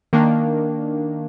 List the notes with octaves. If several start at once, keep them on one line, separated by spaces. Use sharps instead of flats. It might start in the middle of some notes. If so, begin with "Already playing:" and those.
D#3 A#3 D4